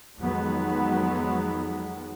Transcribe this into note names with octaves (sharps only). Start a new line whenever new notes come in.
F2 D#3 F#3 G#3 B3